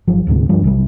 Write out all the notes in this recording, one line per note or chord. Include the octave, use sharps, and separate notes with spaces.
G1 F3 F#3
D1 D2 G#2 C3
G2 F3 G3
B1 C3 G3